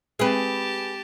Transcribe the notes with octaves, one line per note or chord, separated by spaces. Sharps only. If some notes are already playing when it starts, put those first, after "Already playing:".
G#3 C4 G4 G#4 B4 A5